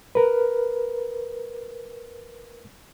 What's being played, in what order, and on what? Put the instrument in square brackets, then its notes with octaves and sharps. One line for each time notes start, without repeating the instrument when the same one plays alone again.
[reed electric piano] A#4 B4